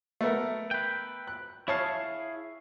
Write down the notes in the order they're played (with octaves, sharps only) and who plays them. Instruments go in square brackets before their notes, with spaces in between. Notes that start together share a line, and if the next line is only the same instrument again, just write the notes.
[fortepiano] A3 B3 A#4
[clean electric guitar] B4 G5
[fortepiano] F#6
[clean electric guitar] E4 G#4 F5 [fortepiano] C#5 A5